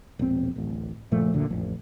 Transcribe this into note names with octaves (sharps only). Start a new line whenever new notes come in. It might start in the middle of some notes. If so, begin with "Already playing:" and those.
E1 A#1 C4
D1 A1
F#1 A#2 F3 A3
F#1 D2 A#2 D3
A1 F2